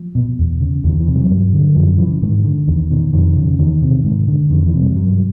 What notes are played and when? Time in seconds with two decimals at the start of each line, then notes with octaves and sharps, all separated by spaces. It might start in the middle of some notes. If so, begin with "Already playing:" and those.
Already playing: F3
0.15 B2
0.39 E2
0.61 C#3
0.84 E2 D#3
1.00 E3
1.07 C3
1.15 F#3
1.30 G2
1.54 D3
1.76 F#2 F3
1.98 C#3 E3
2.21 G#2 D#3
2.44 D3
2.68 E2 D#3
2.90 B2 D#3
3.13 F2 D#3
3.37 C#3
3.58 E2 D#3
3.82 C3
4.04 G#2 D#3
4.27 D3
4.50 F2 D#3
4.66 E3
4.73 C3
4.81 G3
4.96 G2 F#3